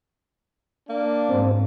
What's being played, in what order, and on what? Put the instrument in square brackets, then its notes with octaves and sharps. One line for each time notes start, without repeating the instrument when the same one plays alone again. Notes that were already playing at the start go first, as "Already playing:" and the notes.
[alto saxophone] A#3 [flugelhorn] D4
[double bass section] G#2 [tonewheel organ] C4